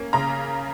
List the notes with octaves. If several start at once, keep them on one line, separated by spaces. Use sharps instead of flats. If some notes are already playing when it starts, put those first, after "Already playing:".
Already playing: A#3 C#4
C#3 A#5